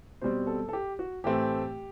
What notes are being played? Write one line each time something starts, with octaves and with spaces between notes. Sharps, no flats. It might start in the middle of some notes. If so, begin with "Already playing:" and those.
B2 G3 C4 C5
A4
A4
G4
F#4
A2 E3 A3 C4 G4